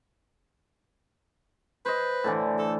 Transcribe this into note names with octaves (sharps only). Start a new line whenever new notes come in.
B4 C5 D#5
A2 D3 E3
A4